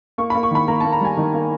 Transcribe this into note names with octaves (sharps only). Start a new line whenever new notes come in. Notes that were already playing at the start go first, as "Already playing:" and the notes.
A#3 C#6
A#3 B5
C#6
D#3 B5
A#3 A#5
A#3 A5
A#5
G3 G#5
D#3
A#3